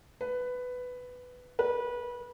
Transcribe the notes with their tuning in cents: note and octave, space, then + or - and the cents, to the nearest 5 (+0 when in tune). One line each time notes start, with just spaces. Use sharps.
B4 +10
B4 -25